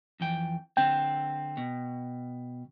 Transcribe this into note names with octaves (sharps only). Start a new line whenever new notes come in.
F2 E3 G5
D3 C4 G5
B2